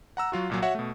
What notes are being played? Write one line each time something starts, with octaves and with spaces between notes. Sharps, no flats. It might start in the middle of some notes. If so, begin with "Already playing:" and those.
F#5 A#5 E6
F#3 F4 F#4
C2 A#2 F#3
F#4 C#5 E5 F#5
B2 A3